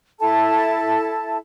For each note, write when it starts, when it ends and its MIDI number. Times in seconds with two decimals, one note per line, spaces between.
0.19 1.37 64
0.19 1.37 69
0.19 1.37 81